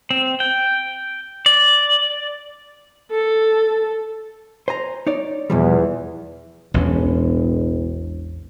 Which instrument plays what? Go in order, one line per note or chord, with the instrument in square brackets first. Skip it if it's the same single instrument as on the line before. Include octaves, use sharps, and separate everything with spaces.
[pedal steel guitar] C4
G5
D5
[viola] A4
[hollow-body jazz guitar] C5 G#5 A#5
D#4 C#5 D5
[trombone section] E2 [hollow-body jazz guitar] B2 F3 G3
[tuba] E1 [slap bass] A1 E2 C#4